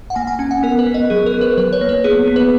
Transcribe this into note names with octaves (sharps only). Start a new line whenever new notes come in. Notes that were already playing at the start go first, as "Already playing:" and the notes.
F#5
A#3 G#5
G#5
C#4 G#5
F#5
B3 A#4
B4
B3
D#5
F#3 G#4
A#4
F#3
B4
F#3 B4
C#5
A#3
B4
B3 G#4
B3
B4